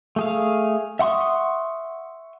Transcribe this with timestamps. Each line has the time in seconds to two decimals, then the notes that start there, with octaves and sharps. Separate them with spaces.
0.16 A3 G#4 F5
0.99 E5 F#5 C6 C#6 D#6